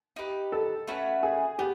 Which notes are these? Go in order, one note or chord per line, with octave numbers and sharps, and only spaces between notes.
D#4 G4 B4
A4
A3 C#4 F#4 B4
G#4
B3 G4